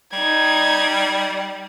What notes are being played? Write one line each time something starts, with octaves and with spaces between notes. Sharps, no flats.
G3 D#4 G#6